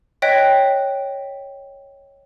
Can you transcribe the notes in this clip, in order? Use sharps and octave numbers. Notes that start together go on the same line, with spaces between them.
C#5 D#5 G5 F#6 B6